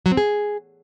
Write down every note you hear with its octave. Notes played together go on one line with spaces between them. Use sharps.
F#3
C4
G#4